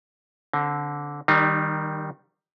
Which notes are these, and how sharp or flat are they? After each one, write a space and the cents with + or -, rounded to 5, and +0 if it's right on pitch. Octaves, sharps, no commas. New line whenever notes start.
D3 -15 C4 +15
D#3 +0 G3 +0 D#4 -40